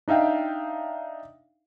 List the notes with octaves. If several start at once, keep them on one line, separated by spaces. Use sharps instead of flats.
D4 D#4 E5 F5 G5